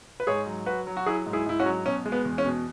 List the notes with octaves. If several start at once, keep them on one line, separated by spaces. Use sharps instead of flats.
B4
G#2 G#4 C#5
F#3
F#3 F#4 B4
F#3
F#4
F#3 E4 G#4
G#2
E4 G#4
G#2 E4
C#4 F#4
F#3
B2 C#4
G#3
B3
E2
C#4
B2